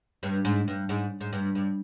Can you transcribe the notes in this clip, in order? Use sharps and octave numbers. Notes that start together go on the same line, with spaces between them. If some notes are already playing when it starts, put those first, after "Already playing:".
G2
G#2
G2
G#2
G#2
G2
G2